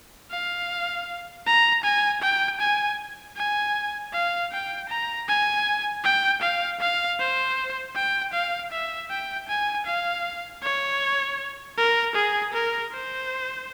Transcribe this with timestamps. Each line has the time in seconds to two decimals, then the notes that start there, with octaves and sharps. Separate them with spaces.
0.31 F5
1.46 A#5
1.84 G#5
2.22 G5
2.60 G#5
3.37 G#5
4.13 F5
4.52 G5
4.89 A#5
5.28 G#5
6.04 G5
6.42 F5
6.80 F5
7.19 C5
7.96 G5
8.33 F5
8.71 E5
9.10 G5
9.49 G#5
9.87 F5
10.63 C#5
11.78 A#4
12.16 G#4
12.54 A#4
12.92 C5